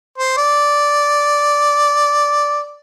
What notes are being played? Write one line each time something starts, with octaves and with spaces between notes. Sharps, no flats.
C5
D5